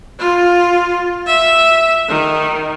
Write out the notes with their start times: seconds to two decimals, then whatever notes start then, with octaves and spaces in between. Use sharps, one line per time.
0.19 F4
1.27 E5
2.08 D#3